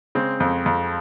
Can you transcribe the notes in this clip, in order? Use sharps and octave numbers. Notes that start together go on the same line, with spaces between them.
C#3 G#3 C4
F2
F2